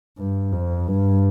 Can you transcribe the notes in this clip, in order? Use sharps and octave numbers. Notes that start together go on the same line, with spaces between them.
G2
F2
G2